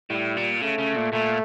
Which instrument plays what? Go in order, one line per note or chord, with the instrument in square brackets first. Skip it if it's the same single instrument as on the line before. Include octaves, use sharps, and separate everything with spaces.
[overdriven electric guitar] A2 [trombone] G3
[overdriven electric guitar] A#2
[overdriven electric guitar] C#3 [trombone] A3
[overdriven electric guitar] C#3
A#2
[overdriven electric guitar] A#2 [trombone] A3